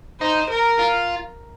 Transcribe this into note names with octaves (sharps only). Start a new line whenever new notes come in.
D#4 C5
A#4
F4